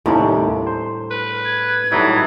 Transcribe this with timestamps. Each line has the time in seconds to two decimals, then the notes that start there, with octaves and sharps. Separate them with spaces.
0.06 D#2 A2 C3 G3 C#4 D4
0.67 C5
1.11 B4
1.45 G#6
1.92 A2 E3 F#3 G3 D#4